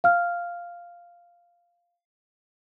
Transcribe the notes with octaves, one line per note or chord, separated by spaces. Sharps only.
F5 F6